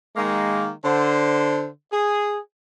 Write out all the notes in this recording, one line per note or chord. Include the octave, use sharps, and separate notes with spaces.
D#3 G#3 A#3
D3 C5
G#4